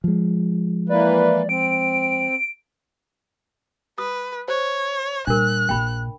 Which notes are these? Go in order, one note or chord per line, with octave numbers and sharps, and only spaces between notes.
F3 G#3
E3 A#3 B4 D5
C4 D7
B4 D#6
C5 C#5
A#2 G3 D4 A#4 F#6
A#1 A#2 G5 B5